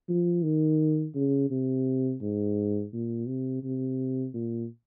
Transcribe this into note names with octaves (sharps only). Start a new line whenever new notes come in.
F3
D#3
C#3
C3
G#2
A#2
C3
C3
A#2